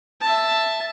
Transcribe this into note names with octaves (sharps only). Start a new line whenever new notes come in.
E5 A5